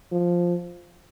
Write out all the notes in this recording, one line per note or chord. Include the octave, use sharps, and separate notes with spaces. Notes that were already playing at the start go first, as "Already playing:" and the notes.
F3